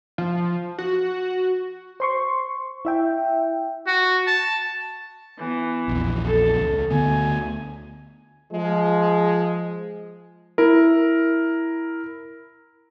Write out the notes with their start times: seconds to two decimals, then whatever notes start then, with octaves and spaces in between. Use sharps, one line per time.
0.18 F3
0.78 F#4
2.00 C5 C6 C#6
2.85 E4 E5 G5
3.87 F#4
4.27 A5
5.38 E3 B3
5.88 A#1 E2
6.25 A4
6.58 C#2
6.91 D2 D3 B3 G#5
8.52 F3 G#3
10.58 E4 A#4